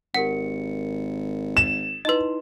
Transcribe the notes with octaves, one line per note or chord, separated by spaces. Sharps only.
G#1 G4 A#4 F#5 C#7
E7
D#4 E4 B4 D#5 C6